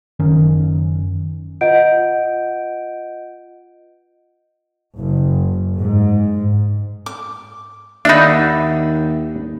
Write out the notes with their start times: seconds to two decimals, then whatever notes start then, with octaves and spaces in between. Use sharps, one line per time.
0.19 F#1 D#3 C#4
1.61 F4 B4 D#5 F#5 G6 D7
4.99 F#1
5.78 G#2
7.06 D6
8.05 D#2 D4 D#4 E5 F#5 B5